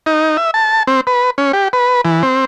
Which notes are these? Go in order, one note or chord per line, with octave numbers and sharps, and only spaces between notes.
D#4
E5
A5
C4
B4
C#4
G4
B4
E3
C4